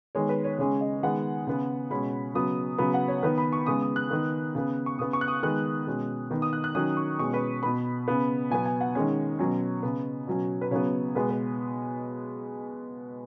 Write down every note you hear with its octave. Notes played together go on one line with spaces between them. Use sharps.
D#3 G#3 B3 C#5
B4
C#5
C#3 G#3 C#4 C#5
D#5
D#3 G#3 B3 F#5
C#3 B3
B2 G#3 C#4 B5
C#3 F#3 B3 D#6
C#3 F#3 B3 B5
F#5
C#5
D#3 B3 B4
B5
C#6
C#3 G#3 B3 D#6
D#6
F#6
D#3 B3
C#3 B3
C#6
C#3 B3 D#6
C#6
F#6
D#6
D#3 G#3 B3 F#6
B2 G#3 C#4
D#3 B3
D#6
F#6
F#6
D#3 F#3 C#4 D#6
C#6
B2 G#3 C#4 C#6
B4
B2 B3 B5
C#3 B3
B2 F#3 B3 G#5
G#5
F#5
D#3 G#3 C#4
B2 F#3 C#4
C#3 B3
B2 F#3 C#4
B4
C#3 F#3 B3 C#5
B2 G#3 B3 B4
B4